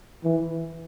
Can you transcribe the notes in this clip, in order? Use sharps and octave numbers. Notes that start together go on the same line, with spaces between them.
E3